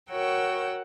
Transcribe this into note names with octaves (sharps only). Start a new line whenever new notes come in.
F#4 A#4 C#5 F#5 G5 E6